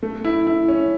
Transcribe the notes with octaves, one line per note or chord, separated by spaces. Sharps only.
A3
E4
E4
C#4